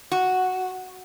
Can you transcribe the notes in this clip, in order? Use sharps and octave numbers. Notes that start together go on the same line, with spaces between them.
F#4